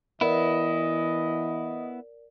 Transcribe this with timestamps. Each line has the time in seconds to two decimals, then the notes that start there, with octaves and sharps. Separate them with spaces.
0.21 E3 B3 E4 A#4 D5 D#5